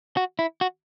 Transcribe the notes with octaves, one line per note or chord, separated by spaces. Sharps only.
F#4
E4
F#4